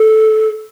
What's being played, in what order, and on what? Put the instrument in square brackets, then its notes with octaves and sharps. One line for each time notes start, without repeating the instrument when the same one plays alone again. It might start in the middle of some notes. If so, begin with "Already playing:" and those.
Already playing: [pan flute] A4